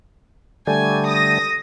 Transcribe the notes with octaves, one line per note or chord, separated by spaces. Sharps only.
D3 G3 A3 G#5
D#6 A#6